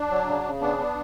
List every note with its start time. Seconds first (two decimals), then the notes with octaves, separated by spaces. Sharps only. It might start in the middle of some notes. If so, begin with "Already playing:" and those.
Already playing: D4
0.10 F#3
0.26 C#3
0.44 C#3
0.61 B3 D4
0.78 B3